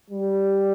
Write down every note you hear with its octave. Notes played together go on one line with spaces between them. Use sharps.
G3